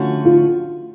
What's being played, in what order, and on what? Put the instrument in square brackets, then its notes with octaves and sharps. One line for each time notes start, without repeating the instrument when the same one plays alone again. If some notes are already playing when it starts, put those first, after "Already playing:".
Already playing: [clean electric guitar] D3 F3 A3 C#4 F#4
[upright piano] F4